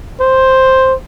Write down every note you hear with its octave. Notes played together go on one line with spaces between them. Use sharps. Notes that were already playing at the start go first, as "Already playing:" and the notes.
C5